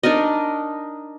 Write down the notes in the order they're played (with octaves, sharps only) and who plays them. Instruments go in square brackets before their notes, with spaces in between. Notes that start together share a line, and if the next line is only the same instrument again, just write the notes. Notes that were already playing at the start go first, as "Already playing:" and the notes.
[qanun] D4 D#4 A#4 D#5